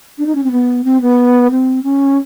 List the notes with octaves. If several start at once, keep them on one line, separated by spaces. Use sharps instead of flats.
D4
D#4
C#4
C4
B3
C4
B3
C4
C#4